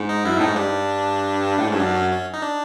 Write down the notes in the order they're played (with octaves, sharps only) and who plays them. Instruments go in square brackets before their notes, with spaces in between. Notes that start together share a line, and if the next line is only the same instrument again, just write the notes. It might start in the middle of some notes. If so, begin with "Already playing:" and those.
Already playing: [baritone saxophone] G#2
[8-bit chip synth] D#4
[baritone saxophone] F#2 [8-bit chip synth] E4
[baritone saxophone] A2 [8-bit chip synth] D#4
[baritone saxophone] G#2
[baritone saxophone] G2 [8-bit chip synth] D4
[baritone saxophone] A2
G#2
[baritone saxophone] G2 [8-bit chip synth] C#4
[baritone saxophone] F#2 [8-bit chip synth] D4
[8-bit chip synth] C#4
C#4
D#4
D4